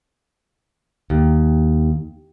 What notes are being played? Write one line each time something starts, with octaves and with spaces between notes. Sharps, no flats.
D#2